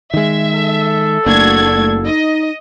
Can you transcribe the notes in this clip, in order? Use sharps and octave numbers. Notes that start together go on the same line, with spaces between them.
D#3 G#3 E5
A4
F#1 A3 A#3 D4 F#4 G#6
A3
D#4 D#5